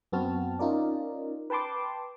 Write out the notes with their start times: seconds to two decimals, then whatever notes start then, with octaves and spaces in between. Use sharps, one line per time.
0.12 F#2 B3 C4 F#4 A5 F6
0.59 C#4 D#4 F4 A#4 D5
1.50 B4 G5 A5 C6 D6